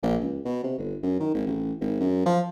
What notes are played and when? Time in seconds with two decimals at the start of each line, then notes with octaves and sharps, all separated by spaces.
0.03 A#1
0.21 C#2
0.45 B2
0.64 C3
0.78 G1
1.03 F#2
1.20 D#3
1.34 G#1
1.47 A1
1.81 G#1
2.00 F#2
2.26 F3